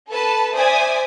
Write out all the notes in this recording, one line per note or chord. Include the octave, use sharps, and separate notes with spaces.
A4 B4 A5
C5 D5 E5 G#5 D#6